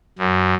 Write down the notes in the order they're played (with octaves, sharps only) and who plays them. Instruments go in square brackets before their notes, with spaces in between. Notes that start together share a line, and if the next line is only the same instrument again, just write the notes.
[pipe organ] F#2